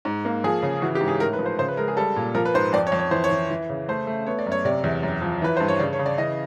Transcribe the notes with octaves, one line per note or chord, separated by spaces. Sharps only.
G#2
A#3
F3 G#4
C#3
E3 F#4
G4
G#2
G#4
A2 A#4
B4
F3
C5
C#3 C5
B4
G#3 A#4
G#4
G3 A4
A#2
F3 A#4
B4
G#2 C5
F2 D5
C#5
F2
C#5
E3 C5
C#5
E3
E3
C#3
A3 C5
A3
B3 C#5
D5
F#2
C#5
C3 D5
E2
F#2
F3
E3 B4
G2 C5
C#5
C#3 D5
C#5
C#3
D5
E3 D#5